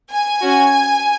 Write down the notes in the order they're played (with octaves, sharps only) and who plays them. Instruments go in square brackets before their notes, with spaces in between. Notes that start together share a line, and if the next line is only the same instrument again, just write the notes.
[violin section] G#5
C#4 F#4